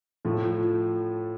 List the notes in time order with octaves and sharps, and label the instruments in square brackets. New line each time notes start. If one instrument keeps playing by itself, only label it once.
[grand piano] A2 F3 A3